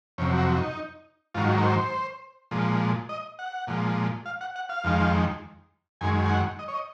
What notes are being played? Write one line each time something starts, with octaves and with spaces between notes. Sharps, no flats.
F2 C3 F#3 C#4
F#4
D#4
G#2 D#3 F#3 F4
A#4
C5
A#2 F3 G#3
D#5
F#5
A#2 F3 G#3
F5
F#5
F#5
F5
F2 D#3 G#3
F#2 D#3 G#3 G#5
G#5
F#5
D#5
C#5
D#5